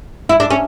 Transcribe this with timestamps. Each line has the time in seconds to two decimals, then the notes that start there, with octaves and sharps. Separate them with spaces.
0.29 E4
0.40 D4
0.50 C#4